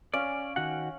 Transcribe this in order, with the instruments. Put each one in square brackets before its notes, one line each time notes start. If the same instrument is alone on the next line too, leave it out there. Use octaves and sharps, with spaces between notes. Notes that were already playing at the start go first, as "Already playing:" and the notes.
[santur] C#4 F5 [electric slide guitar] D5
[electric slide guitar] D#3 F#4 F#5